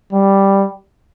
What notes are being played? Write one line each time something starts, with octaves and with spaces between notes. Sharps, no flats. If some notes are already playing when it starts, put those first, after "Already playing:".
G3